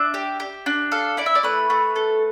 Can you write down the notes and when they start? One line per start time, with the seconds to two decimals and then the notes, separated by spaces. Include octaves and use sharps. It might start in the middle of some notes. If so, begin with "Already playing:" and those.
Already playing: D4 E5
0.14 G4
0.40 G4
0.66 D4
0.92 A4 F5
1.17 E4 D5
1.26 E5
1.35 D5
1.43 A3 B4
1.70 A3
1.96 A4